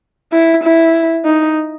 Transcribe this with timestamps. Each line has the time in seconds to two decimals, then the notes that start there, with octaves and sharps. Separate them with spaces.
0.33 E4
0.64 E4
1.25 D#4